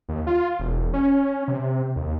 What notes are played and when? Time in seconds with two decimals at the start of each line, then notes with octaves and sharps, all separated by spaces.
0.09 D#2
0.27 F4
0.59 E1
0.94 C#4
1.48 C3
1.96 D#2